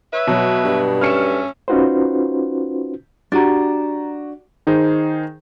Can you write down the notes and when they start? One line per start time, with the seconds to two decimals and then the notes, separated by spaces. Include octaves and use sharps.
0.12 B4 C#5 E5
0.27 B2 F#3
0.65 G2
1.01 F#3 A3 C#4 F6 C#7 E7
1.68 C#4 D#4 F4 F#4 B4 C5
3.32 D4 F#4 G4 A#5 A6
4.67 D#3 D#4 G#4 C5